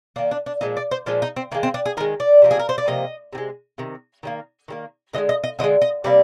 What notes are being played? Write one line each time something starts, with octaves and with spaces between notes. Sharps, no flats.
D#3 A#3 D4
D4
D4
A#2 F3 G#3 D#4
D5
C5
A#2 F3 G#3 F4
D#4
C4
D#3 G#3 A#3
C4
D4
G#4
D#3 G#3 A#4
D5
C3 F3 A#3
G#4
A#4
C5
D5
C3 F3 A#3 D#5
C3 D#3
G#3
C3 D#3
D#3 G3 A#3
D#3 G3 A#3
D3 F3 G#3 D#5
D#5
D#5
D3 F3 D#5
G#3
D#5
C3 G3 A#3 D5